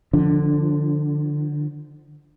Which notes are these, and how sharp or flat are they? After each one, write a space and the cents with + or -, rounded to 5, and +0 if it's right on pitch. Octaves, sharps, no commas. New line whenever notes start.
D3 +15 F3 +0 D4 -15